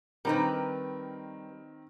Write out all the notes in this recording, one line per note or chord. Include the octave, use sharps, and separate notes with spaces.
D#3 G3 C4 D#4 A#4 B4